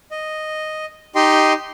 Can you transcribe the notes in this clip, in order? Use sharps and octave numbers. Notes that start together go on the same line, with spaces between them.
D#5
D#4 G4 D#5 G5 C6